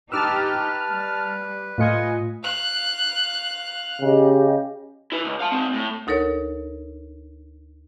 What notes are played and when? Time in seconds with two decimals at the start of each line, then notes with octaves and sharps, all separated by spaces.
0.12 D#4 G4 B4 A5 D6 E6 F6
0.89 G3
1.78 A2 A3 F4 D#5 G#5 C#7
2.43 F5 F#6
4.01 C#3 G4 D#5
5.12 E4 B4
5.24 C#2
5.40 F5 A5
5.52 G#3 C4
5.74 A2
6.07 D2 D#4 A4 A#4 C#5